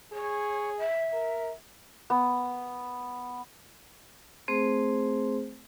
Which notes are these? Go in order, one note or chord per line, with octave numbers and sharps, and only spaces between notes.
G#4 C#5
E5
A#4
B3
A3 C4 G#4 C5